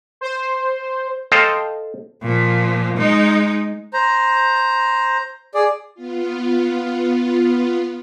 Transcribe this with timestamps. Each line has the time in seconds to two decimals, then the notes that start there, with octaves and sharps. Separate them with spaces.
0.21 C5
1.32 A4 C5 D#5 F5 G5
2.22 A#2 F3
2.97 G#3 D#4
3.93 C5 A#5
5.54 G#4 D5
5.95 B3 F4